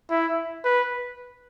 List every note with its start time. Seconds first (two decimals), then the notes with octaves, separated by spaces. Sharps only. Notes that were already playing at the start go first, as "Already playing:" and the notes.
0.10 E4
0.65 B4